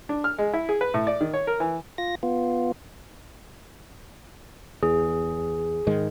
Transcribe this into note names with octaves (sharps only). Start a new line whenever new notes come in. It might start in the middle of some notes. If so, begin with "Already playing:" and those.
D4
F6
G#3
E4
G#4
B4
A2
D5
D#3
C#5
A#4
E3
F4 A#6
B3 F4
E2 G#4
G#2 D#3 G#3